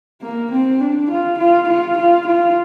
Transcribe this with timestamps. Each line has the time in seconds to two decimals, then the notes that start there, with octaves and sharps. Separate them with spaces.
0.21 A#3
0.51 C4
0.80 D4
1.10 F4
1.38 F4
1.68 F4
1.97 F4
2.27 F4